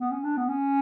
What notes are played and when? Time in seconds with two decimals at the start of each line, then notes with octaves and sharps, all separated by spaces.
0.01 B3
0.11 C#4
0.24 D4
0.37 B3
0.49 C#4